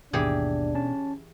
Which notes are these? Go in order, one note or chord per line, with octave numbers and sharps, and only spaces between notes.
G#1 D#2 B2 E3 D4 G4 G#4
C#4 A5